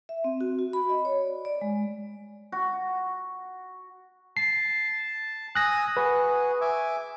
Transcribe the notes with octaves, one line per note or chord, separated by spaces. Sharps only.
E5
C4
F#4
F#4
B5
D#5
C#5
D5
D5
G#3
F#4
A5 C7
G#5 D#6 E6 F#6 A#6
F#4 G#4 B4
E5 G#5 D6